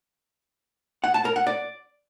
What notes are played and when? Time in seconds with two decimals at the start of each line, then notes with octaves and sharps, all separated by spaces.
1.04 F#5
1.14 A5
1.25 A#4
1.36 F#5
1.47 D5